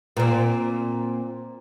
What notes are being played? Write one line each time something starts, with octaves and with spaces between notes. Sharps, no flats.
A#2 C4